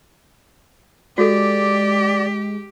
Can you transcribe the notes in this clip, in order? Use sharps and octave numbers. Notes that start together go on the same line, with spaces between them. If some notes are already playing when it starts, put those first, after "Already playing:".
G#3 F#4 G4 A4 D5